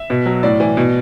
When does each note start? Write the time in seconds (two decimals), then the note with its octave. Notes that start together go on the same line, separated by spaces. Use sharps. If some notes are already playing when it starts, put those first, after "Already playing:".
Already playing: E5
0.10 B2
0.26 F#3
0.43 A2 D5
0.60 E3
0.77 B2